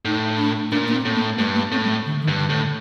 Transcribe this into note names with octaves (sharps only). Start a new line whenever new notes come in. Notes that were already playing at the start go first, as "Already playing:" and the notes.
A2 D#4
D4
A#2 D4
A#3
C4
A2
A#3
G2 A3
A#3
A2 C4
G3
A3
D3
D#3
G2
D3
A2
D3